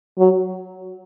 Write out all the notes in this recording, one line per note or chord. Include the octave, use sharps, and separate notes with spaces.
F#3